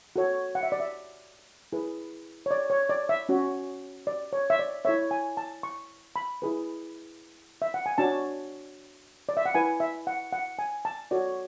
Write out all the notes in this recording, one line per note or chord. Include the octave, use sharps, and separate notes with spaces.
F#4 A4 C#5
F#5
E5
D5
E5
E4 G#4 B4
C#5
D5
C#5
D5
E5
C#4 F#4 C#5
D5
C#5
E5
D5
E4 A4 C#5 E5
G#5
A5
C#6
B5
E4 G#4 B4
E5
F#5
G#5
D4 F#4 C#5 A5
D5
E5
F#5
E4 B4 G#5
E5
F#5
F#5
G#5
A5
F#4 A4 C#5 D5